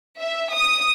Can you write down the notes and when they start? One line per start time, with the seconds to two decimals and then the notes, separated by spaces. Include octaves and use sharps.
0.20 E5
0.54 D#6